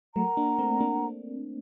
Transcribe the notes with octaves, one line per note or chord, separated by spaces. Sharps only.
F#3 A3 A#4 F#5 A#5
A#3 D4
A3 C4
A#3 D4